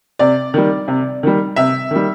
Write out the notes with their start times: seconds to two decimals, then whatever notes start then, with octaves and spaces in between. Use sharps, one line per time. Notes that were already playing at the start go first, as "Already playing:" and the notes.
0.19 C3 D5
0.54 D#3 G3
0.88 C3
1.23 D#3 G3
1.56 C3 E5
1.91 D#3 G3